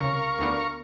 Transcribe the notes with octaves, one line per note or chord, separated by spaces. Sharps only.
C2 C#3 A#4 F5 C#6
D2 B3 D4